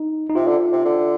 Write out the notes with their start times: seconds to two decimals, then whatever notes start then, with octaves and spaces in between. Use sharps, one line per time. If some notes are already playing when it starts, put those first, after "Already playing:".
Already playing: D#4
0.30 D#4
0.35 C3 F4
0.47 D3
0.73 C3
0.85 D3